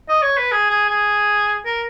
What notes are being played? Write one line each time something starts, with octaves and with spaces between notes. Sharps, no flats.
D#5
C#5
B4
G#4
G#4
G#4
A#4